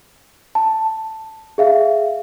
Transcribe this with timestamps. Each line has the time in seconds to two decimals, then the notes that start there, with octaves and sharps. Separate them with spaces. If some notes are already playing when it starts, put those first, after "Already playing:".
0.55 A5
1.58 G#4 E5 F5